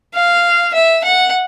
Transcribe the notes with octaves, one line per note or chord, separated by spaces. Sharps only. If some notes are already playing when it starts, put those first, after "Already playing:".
F5
E5
F#5